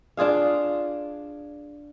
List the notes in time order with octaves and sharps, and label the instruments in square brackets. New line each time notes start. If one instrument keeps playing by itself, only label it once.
[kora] D4 F4 G#4 F5